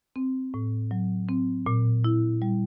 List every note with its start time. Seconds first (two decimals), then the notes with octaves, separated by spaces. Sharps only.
0.16 C4
0.54 A2
0.91 F#3
1.29 C4
1.66 A#2
2.04 E4
2.42 G3